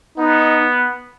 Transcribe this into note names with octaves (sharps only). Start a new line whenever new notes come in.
B3 D#4